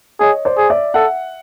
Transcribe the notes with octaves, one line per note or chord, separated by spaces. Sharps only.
G#4 C#5 D#5
C5 D5
G#4
D5 E5
A4 E5 F#5